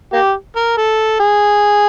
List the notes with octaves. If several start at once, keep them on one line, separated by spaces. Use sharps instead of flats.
A#3 G4
A#4
A4
G#4